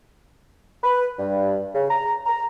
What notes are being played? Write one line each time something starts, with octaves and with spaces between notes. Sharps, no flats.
B4
G2
C#3
A#5
A#5